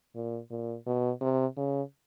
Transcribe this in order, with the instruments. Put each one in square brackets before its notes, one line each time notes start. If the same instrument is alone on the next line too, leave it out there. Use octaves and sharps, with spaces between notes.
[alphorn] A#2
A#2
B2
C3
C#3